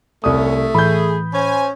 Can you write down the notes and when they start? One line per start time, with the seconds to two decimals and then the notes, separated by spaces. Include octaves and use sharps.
0.24 C2 F2 C3 A3 C#4 D#6
0.75 A2 E3 G#4 B5 G6
1.34 C#4 C5 G#5